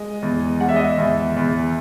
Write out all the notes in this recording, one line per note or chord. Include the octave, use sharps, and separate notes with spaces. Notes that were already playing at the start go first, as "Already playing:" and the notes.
Already playing: G#3 D#5
E2
G#3 F#5
E5
D#5
E5
E2
E2